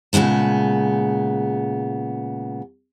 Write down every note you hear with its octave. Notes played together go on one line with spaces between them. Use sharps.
A#2 C#3 G#3 B3 A5